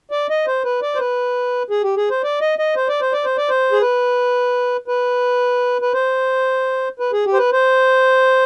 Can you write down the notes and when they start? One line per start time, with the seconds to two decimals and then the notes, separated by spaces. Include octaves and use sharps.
0.11 D5
0.30 D#5
0.47 C5
0.64 B4
0.82 D5
0.95 C5
0.99 B4
1.70 G#4
1.83 G4
1.97 G#4
2.10 C5
2.23 D5
2.41 D#5
2.59 D#5
2.76 C5
2.88 D5
3.01 C5
3.13 D5
3.25 C5
3.37 D5
3.49 C5
3.72 G#4
3.82 B4
4.88 B4
5.82 B4
5.93 C5
6.99 B4
7.13 G#4
7.26 G4
7.34 C5
7.38 B4
7.52 C5